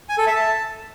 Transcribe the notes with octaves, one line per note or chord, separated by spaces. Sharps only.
G#5
A4
E5
A5